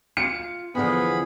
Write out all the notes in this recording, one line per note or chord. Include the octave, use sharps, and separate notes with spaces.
F4 C#7
E2 D3 F3 B3 G#4 B5